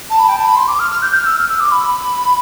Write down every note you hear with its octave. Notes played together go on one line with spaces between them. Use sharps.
A5
B5
G5
A5
B5
C6
D6
F6
F6
G6
F6
E6
F6
E6
D6
B5